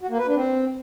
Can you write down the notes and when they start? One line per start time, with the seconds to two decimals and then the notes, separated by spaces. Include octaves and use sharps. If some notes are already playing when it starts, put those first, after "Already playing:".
0.01 F#4
0.10 A#3
0.19 B4
0.27 D4
0.36 C4